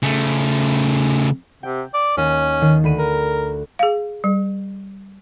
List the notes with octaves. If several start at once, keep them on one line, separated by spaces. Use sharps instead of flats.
C#3 A3
C3 G5
D5
D#2 C#4
D#3
D2 B5 D#7
A#4
G#4 F5
G3